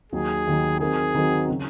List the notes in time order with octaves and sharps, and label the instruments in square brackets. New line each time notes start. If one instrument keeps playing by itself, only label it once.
[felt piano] D#2 D#3 F#3 [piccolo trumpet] G#4
[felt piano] D#2 D#3 F#3
[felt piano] D#3 F#3 C4 F#4 A#4 [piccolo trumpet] G#4
[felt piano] D#3 F#3 C4 F#4 A#4
C#3 F#3 C#4